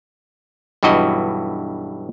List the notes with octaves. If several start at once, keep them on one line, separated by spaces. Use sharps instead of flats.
B1 G2 E3 F#4 D#5